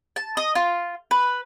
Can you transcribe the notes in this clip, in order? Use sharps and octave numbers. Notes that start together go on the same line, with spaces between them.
A5
D#5
F4
B4